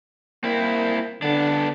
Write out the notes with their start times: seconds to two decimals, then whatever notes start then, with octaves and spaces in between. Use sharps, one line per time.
0.44 A#3 C4 E4
1.22 D3 B3 D4